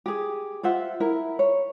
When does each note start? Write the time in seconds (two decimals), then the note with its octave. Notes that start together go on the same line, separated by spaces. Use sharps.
0.06 G4 G#4
0.63 F4 C5 E5 F#5
1.00 E4 A#4
1.39 C#5